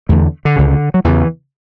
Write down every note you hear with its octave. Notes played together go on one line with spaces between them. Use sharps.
E2 D3 A3
D3
C#2 C#3
F#3
E2 C#3 E3